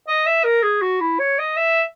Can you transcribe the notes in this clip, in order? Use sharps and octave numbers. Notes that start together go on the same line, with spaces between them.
D#5
E5
A#4
G#4
F#4
E4
C#5
D#5
E5